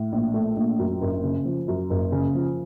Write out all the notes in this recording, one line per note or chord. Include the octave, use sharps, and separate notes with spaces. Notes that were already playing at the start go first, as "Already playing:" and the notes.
Already playing: A2
A#1
A3
A#1
F#2
F#1
C#3
F3
F#2
F#1
C#3
F3